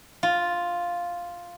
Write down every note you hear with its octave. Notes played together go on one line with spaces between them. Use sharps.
F4